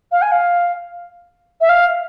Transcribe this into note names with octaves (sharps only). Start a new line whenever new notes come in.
F5
G#5
F5
E5
F5